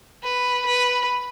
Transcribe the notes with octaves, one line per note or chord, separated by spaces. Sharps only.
B4
B4